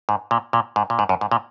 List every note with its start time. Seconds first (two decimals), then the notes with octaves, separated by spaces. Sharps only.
0.09 G#2
0.31 A#2
0.53 A#2
0.76 G#2
0.90 A#2
0.99 G#2
1.09 F#2
1.21 G#2
1.31 A#2